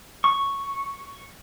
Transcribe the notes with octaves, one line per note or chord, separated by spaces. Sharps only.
C#6